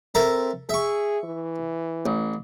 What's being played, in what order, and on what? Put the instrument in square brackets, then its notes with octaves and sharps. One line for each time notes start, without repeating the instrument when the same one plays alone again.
[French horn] C4 [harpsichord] A4 A#4 E5
[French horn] G#4 [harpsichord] E5 C#6
[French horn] E3
[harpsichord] A1